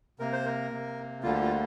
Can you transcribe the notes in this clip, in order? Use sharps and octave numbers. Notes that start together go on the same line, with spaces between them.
C3 A#3 A#4
C5
A#4
C3 A#3
D2 D3 G3 A#3 F4
G4
F4